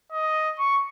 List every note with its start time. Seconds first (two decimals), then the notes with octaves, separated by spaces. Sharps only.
0.12 D#5
0.59 C#6